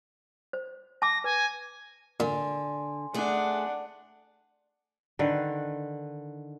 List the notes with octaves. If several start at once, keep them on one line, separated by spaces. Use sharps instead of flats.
C5
A5 D6 A#6
B4 G#5
A#2 D3 G#5 C6
A3 D4 G#4 F#5
D3 D#3 B4